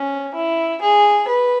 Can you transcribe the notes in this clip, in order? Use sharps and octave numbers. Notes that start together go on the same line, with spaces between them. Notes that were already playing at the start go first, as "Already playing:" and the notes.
Already playing: C#4
E4
G#4
B4